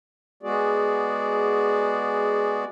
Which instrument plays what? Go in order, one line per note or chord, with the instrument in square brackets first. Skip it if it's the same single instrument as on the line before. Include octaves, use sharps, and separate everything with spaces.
[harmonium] G#3 B3 F#4 G#4 D5